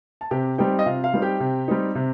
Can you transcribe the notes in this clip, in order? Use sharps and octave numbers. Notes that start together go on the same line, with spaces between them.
A5
C3 G4 G5
G3 C4 D#4 G4 G5
D#5
C3 F4 F5
F4 F5
G3 C4 D#4
G4 G5
C3
G3 C4 D#4
C3